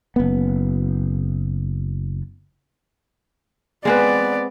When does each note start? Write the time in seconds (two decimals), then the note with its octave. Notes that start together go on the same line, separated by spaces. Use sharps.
0.16 F#1 B3
3.85 G#3 B3 C4 B4 D5